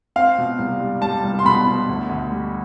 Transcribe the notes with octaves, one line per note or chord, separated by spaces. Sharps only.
C4 F5
B2
C2
G3
G3 A5
C2
C6
B2 B5
B2
D2
D2
G3